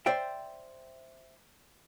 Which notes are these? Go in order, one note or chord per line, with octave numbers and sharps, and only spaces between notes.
C5 D5 E5 G5